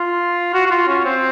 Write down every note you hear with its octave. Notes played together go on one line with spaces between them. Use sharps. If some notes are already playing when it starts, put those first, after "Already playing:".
Already playing: F4
F#4
F#4
F4
C#4
C4